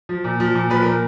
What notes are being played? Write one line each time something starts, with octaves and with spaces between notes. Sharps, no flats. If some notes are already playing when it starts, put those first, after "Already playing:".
F3
A#2
F3
A#2
F3 B4
A#2 A#4